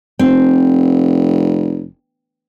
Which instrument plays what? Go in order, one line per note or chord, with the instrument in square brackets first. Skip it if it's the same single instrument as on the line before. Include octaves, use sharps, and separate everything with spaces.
[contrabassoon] F1 [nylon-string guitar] C4